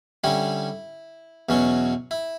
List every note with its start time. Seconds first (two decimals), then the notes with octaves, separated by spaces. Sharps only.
0.24 D3 G3 C#4 E4
1.49 E2 B2 F#3 C#4
2.11 E4